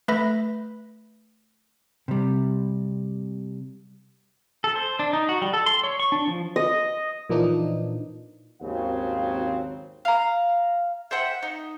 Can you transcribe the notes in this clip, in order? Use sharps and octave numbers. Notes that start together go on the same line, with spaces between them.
A3 B4 E5 B5 A#6
C3 G3
A4
C5
D4
D#4
F#4
G3
A4
C6
C#5
C#6
D4
F3
D#5
A#2 E3 F3 D4 D#4
G#1 D#2 C#3 F#3 C4 F5
F5 A#5
C5 E5 F#5 G5
D#4